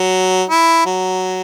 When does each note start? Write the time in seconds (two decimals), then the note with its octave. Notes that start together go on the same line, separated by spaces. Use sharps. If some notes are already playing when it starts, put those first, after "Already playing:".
Already playing: F#3
0.50 E4
0.85 F#3